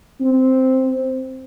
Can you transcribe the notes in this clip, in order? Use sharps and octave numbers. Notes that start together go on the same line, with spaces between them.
C4